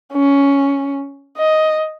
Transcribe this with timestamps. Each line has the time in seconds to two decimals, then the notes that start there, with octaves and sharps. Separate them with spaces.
0.14 C#4
1.37 D#5